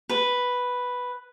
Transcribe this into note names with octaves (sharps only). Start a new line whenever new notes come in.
B4